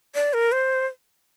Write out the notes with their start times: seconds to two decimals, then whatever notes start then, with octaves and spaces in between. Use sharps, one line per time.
0.15 D5
0.33 A#4
0.52 C5